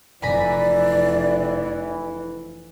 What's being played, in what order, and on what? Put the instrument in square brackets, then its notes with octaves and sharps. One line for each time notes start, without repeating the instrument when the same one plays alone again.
[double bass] F1 F2 [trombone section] E3 [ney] D5 [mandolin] G#5 A#5 B5